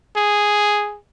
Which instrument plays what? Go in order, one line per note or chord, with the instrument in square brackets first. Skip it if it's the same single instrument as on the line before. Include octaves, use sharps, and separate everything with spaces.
[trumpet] G#4